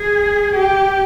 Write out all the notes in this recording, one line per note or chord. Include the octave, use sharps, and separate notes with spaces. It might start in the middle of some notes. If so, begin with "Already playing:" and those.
Already playing: G#4
G4